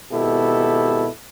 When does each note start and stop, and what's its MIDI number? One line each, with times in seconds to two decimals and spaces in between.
0.12 1.07 32
0.12 1.07 47
0.12 1.07 64
0.12 1.07 67
0.12 1.07 69